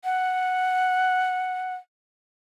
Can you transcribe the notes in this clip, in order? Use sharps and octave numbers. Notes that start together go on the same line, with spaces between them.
F#5